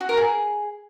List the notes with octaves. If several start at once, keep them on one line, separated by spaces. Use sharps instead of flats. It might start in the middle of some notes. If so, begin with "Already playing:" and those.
F#4
A#4
G#4